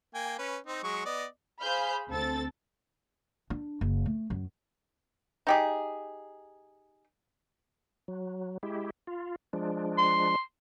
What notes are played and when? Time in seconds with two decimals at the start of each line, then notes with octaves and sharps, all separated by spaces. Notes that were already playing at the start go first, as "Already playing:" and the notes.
0.15 A#3 G5 G#5
0.39 C#4 B4
0.67 C4 D#4
0.83 F#3 G#3 C#6
1.05 B3 D5 D#5
1.61 G#4 C5 F5 B5 F6 G6
2.09 D2 C4 A4 A6
3.50 D4
3.81 F#1
4.06 A3
4.30 F#2
5.47 D#4 G4 G#4
8.08 F#3
8.63 G#3 E4 G4
9.07 F4
9.53 F3 G#3 D4
9.98 C6